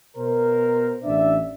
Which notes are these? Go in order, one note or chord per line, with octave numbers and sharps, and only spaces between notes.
B2 A#4 C5
A1 D4 D5 E5